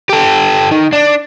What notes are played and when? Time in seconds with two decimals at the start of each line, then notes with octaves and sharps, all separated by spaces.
0.10 G4 A4
0.71 D#3
0.93 D4